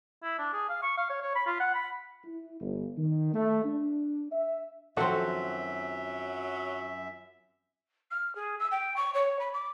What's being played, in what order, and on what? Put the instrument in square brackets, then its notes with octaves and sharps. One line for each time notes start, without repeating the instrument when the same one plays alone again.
[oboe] E4
D4
G#4
F5
C#6
F5
C#5
C#5
B5
F4
F#5
B5
[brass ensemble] E4
G1
D#3
A3
D4
E5
[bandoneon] F#2 E5 [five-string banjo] D#3 F3 A4 [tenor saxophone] F#3 [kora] C4 F#4
[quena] F6
G#4
E6
G5
C#6
C#5
B5
D6